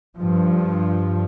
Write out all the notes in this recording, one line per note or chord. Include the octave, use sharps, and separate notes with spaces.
G2 F3